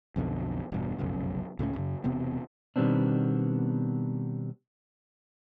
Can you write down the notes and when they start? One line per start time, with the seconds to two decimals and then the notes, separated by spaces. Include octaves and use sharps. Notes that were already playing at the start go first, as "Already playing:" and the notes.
0.16 B1 F2 B2 D3
0.72 E1 G2 B2
0.98 F1 B1 F#2 C#3
1.59 C#2 A2 F#3 C#4
1.75 A1 F#2 C#3
2.04 E1 C3 B3 C4
2.76 B2 D#3 G3 B3 C4 D4